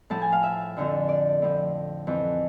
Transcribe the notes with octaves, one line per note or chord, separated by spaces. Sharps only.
A2 F3 A5
G#5
F5
E5
F2 D3 F3
D5
A2 F3
F2 E3